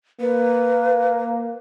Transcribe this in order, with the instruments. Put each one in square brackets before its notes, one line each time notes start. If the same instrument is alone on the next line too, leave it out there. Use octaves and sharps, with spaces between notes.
[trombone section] A#3 [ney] B4